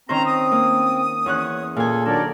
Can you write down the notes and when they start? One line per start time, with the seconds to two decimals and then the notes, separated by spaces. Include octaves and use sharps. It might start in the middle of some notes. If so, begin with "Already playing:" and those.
0.09 D#3 C4 C#4 C5 A#5
0.25 D#6
0.52 A#3
1.26 E2 C#4 C#5 F#6
1.76 A#2 G#4 A4 G#5
2.05 D#3 F#3 D4 A4 A#4 C#5 D5